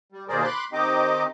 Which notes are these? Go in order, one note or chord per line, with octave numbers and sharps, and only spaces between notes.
G3
D#2 B2 G#4 A#4 C5 D5
B5 C6 D6 F#6
D#3 C4 D#4 G4 D#5 D6